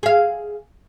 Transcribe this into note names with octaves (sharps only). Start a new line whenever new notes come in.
G#4 F5